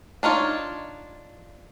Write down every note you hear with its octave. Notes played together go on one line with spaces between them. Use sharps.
D4 D#4 F4 C#5